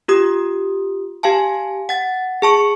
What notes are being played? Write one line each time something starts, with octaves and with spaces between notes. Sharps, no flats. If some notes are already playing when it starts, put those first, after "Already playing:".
F4 G4 D#6
G4 F5 G#5 A5
F#5 A6
G#4 A5 C#6 C#7